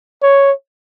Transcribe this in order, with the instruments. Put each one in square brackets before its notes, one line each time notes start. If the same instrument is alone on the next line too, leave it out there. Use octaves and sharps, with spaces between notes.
[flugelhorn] C#5